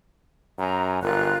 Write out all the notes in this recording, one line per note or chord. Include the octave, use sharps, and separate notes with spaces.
F#2 G#5 A#5
G1 F4 A#4 F#6